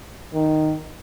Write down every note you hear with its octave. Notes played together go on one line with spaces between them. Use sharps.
D#3